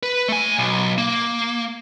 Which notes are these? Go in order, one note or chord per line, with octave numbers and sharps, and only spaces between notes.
B4
A3 G#5
B1
A#3